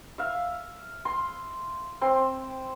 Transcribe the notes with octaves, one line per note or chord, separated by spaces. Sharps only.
E5 F5
C6
C4 C6